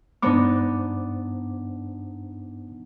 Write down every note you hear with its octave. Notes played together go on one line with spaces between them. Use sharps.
G2 B3 D4 D#4 C5 D6